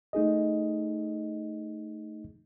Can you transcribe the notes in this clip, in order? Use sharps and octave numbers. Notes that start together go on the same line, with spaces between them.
A3 D#4 G#4 D#5